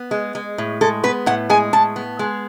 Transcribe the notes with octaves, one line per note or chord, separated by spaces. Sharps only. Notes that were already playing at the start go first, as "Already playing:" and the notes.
Already playing: B3
G#3
G#3
A2
G#3 A4
B3 B4
A2 F#5
G#3 G#5
A2 A5
B3
G#3